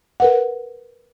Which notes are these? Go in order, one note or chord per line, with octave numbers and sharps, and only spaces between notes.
A#4 B4 F#5